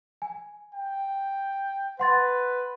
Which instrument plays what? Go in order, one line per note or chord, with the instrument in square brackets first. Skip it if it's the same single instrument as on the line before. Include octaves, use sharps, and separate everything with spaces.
[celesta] G#5
[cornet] G5
[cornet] B4 [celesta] F#5 C6 A6